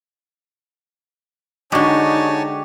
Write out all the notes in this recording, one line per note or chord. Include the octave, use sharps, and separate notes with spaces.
D3 G#3 D#4 F#4 G4 C#5 G#5 A5